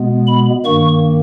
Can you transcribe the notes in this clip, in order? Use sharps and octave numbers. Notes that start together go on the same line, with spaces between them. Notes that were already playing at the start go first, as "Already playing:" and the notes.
Already playing: B2 G#3 B3
B5
G2 D#3 A#3 C#6